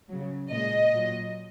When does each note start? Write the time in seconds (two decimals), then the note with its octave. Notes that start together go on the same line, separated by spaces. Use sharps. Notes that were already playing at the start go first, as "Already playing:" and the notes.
0.09 C#3 F#3
0.50 A#2 G#3 D#5
0.92 A#2 F#3